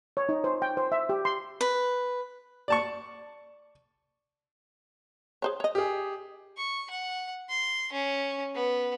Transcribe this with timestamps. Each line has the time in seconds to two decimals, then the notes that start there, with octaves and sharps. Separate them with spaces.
0.17 C#5
0.29 D#4
0.44 C5
0.62 G5
0.77 C5
0.92 E5
1.09 G4
1.25 C6
1.61 B4
2.68 D5 A5 C#6
5.42 G#4 C5 C#5
5.60 C#5 D#5
5.75 G4 G#4
6.57 C#6
6.90 F#5
7.49 C6
7.92 C#4
8.54 B3